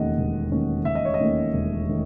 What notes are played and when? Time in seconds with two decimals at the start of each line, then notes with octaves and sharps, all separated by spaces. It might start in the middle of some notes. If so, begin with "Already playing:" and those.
Already playing: E1 D#2 D#3 A3 C#4 D#5 F#5
0.17 E1
0.51 D#2 D#3 A3 C#4
0.85 E1 E5
0.95 D#5
1.05 C#5
1.14 D#5
1.19 D#2 D#3 A3 C#4
1.53 E1
1.89 D#3 A3